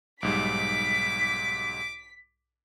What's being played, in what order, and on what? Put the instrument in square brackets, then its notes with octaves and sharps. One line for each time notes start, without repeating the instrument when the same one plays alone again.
[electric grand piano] B1 G#2 G3 [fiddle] D6 [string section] B6